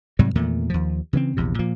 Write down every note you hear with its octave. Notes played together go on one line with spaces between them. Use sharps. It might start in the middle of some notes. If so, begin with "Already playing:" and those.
G#2 C3 F#3 G3
E2 A#2 D#3 A3
D#2 F3
C#3 E3 B3 C4
A#1 E2 C3
A#2 F3 A#3